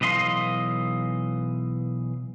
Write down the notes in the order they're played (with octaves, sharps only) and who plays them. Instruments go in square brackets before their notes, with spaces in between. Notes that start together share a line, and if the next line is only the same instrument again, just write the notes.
[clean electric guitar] B1 E3 D#5 F5 C6